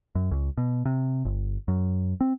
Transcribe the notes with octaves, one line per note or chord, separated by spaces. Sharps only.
F#2
C#2
B2
C3
G1
F#2
C4